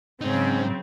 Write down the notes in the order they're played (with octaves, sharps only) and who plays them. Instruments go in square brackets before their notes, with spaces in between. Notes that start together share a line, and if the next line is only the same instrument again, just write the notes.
[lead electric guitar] G#2 D#4 [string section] C#3 F#3 [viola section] C4 [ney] C#4